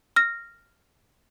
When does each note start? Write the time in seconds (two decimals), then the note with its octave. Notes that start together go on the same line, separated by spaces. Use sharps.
0.16 F6 A#6